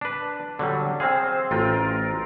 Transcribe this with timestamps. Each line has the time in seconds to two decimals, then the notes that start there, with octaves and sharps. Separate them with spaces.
0.01 D4 B4
0.59 D3 F#3 G3
1.00 C4 G#4 C5 F5
1.51 A1 F4 A#4 G5